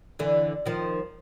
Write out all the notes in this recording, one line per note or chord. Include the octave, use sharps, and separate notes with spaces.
D3 E3
D#3 F3